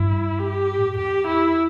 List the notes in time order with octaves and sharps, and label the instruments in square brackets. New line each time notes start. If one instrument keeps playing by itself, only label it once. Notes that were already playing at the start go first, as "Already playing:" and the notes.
Already playing: [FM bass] G2 [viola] E4
[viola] G4
[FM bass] A2
G2
[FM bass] E2 [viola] G4
[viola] E4